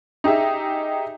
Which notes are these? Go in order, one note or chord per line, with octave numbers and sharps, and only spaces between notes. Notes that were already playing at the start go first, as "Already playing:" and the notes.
D#4 G4 G#4 E5